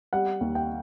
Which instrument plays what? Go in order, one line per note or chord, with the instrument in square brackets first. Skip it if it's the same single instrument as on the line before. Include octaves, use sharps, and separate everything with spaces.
[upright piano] G3 F#5
D#2
G5